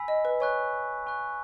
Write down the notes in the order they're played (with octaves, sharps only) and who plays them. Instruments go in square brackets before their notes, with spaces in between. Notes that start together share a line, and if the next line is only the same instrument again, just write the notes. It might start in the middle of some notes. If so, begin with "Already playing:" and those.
Already playing: [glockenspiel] G#5 B5 E6 B6
[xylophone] D#5
B4
[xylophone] C#5 [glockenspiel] G#5 C#6 F#6
[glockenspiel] G#5 C#6 F#6